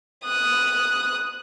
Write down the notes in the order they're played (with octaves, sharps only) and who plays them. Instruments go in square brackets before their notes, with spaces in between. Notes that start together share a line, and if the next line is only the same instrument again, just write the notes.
[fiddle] D#6 F#6